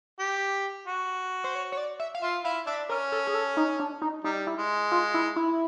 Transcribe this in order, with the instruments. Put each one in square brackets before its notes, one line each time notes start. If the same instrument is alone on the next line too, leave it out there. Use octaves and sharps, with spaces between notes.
[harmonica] G4
F#4
[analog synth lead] C5
C#5
C#5
D5
E5
F5
[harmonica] F4 [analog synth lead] E5
[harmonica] E4 [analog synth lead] F5
[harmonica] D4 [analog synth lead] E5
[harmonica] C#4 [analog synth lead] A#4
[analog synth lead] A4
G#4
A4
D#4
D4
D#4
[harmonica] G3 [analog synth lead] D#4
[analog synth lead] E4
[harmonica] G#3
[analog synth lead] F4
E4
E4